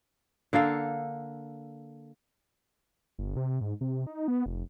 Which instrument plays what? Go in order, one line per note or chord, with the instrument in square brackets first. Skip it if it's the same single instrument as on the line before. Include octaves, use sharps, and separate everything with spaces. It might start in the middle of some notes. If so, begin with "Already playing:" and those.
[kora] D3 A#3 A4 F5
[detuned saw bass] G1
C3
G#2
C3
D#4
B3
F1